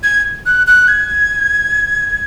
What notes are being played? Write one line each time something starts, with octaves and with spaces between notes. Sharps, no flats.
G#6
F#6
F#6
G#6